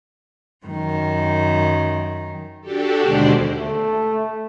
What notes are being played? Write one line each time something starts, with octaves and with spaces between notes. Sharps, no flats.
F#2 D#3
D4 F#4 G4 A4
D#2 B2 D3 G#3 C5 D5
A3